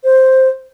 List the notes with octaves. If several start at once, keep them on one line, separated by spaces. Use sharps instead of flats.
C5